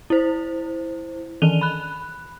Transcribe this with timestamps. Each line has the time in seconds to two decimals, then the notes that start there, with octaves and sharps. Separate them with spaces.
0.10 E4 C5
1.42 D#3 E3 D#7 F7 G7
1.61 B5 F#6